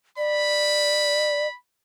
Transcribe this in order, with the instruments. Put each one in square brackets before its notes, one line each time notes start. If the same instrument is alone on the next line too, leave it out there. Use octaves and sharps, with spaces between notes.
[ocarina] D5 [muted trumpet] B5